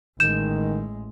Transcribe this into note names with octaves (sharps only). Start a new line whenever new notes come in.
A1 D#3 G#3 G6 E7